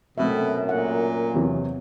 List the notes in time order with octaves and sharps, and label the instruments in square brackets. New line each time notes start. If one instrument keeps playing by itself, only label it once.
[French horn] F#2 [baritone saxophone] B2 [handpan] A3 C4 E5
[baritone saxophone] A#2 [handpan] F#5
[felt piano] E2 C3 F#3